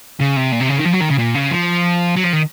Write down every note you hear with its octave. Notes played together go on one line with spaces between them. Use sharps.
C#3
C3
A#2
C3
C#3
D#3
F3
F#3
D#3
C#3
A#2
C#3
F3
F#3
F3
D#3